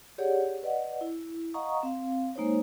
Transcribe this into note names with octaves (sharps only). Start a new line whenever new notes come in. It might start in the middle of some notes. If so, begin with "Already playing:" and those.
G4 G#4 C#5 D5 F#5
B4 D5 D#5 F#5
E4
D#5 F5 F#5 A#5 C#6 D#6
C4 F5
G#3 A#3 D#4 C5 C#5